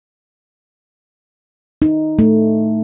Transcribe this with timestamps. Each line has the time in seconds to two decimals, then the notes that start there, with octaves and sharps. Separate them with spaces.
1.82 D#4
2.19 A3